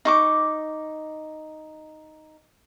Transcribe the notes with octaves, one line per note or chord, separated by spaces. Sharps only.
D#4 C#6 D6